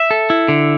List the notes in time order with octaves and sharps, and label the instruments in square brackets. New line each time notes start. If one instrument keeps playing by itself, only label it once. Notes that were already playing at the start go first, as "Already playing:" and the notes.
Already playing: [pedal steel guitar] E5
A4
E4
D3